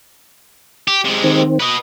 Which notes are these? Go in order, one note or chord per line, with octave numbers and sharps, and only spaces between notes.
G4
C3 G#3
D#3 C4
B4 D#5